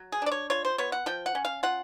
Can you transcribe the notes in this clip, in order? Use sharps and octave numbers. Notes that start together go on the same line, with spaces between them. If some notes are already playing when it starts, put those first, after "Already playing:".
Already playing: F#3
G#4
D4 D5
C#5
F4 C#5
C5
B3 C#5
F#5
F3 G5
F#5
C#4
F5
F4 F#5